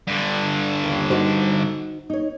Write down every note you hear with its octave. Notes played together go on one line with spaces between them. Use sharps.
G2 D3
D#2 C#3
D#4 F#4 C5
D#4 C#5